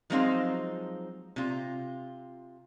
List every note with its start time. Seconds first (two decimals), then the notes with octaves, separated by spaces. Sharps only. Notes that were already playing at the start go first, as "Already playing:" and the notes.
0.10 F3 F#3 G#3 C4 D#4 F5
1.36 C3 F4